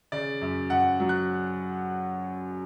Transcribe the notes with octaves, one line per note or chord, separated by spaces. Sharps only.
C#3 D5
F#2
F#2 F#5
F#3
F#6